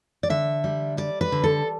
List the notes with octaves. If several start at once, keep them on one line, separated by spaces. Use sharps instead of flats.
D5
D3 E5
G3
G3 D5
B4
D3
A4